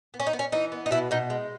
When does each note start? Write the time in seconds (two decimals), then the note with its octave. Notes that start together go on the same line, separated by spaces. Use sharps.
0.14 B3
0.20 C#4
0.27 D#4
0.33 B3
0.39 C#4
0.52 E3 D#4
0.72 B3
0.86 D#4
0.91 B2 E4
1.11 B2 D#4
1.30 G#3